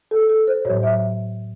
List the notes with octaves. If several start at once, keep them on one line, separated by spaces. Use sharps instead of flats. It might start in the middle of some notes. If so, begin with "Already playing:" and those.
A4
A4
C5
A2 F#3 C#5
E5